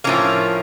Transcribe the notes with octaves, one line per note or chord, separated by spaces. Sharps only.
A2 F3 A#3 C#4